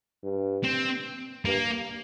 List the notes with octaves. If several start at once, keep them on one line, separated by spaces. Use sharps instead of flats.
G2
C4
G2 A#3